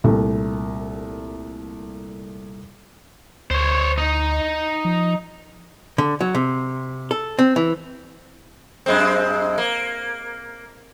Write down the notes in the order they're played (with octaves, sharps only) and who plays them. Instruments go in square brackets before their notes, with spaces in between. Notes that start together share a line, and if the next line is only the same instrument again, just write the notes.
[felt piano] C2 A#2 A3
[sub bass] D2 [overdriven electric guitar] C5 C#5
[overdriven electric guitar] D#4
[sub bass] F3
[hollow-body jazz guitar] D3
F#3
C3
A4
C4
E3
[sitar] F#2 G#3 C4
A#3